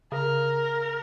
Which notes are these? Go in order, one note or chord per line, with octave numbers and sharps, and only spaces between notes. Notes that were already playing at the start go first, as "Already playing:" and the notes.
C#3 A#4